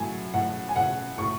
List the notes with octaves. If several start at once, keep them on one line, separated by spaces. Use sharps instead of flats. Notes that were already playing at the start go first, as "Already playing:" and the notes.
Already playing: A2 F#3 G#5
A2 F#5
G#5
A2 F#5
A2 C#6